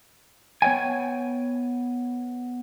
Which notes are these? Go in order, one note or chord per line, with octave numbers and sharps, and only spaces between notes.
B3 C#5 D5 G5 G#5